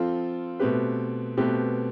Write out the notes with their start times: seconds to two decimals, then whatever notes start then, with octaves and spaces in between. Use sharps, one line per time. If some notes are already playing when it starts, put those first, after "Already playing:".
Already playing: F3 C4 F4 A4
0.59 B2 A3 C4 G4 B4
1.37 B2 A3 C4 G4 B4